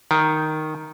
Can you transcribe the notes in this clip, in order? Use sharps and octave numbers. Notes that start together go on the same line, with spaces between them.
D#3